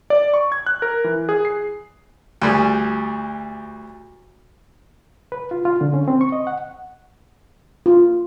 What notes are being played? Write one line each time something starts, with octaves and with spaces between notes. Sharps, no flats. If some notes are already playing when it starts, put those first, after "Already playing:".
D5
C#6
G#6
F#6
A#4
E3
G#4
C7
D2 G3 G#4
B4
F4
F4
D3
C#4
C4
C#6
D#5
F#5
F4